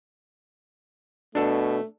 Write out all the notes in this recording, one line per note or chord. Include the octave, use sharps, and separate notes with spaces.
B2 A3 D4 A4